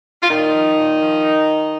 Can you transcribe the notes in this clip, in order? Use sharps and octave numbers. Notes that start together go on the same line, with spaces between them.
F4
A#2 D#3 D#4
F3
A#2
F3